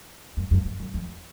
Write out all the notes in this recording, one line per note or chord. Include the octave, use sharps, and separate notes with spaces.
F#2
F#2
F2
F#2
F2